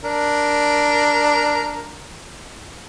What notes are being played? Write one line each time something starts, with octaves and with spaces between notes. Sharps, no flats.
D4 A#4